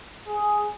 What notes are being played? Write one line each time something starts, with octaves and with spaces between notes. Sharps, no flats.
G#4